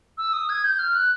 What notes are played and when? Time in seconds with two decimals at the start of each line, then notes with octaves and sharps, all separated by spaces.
0.18 E6
0.33 D#6
0.49 G#6
0.64 G6
0.79 F6
0.95 F#6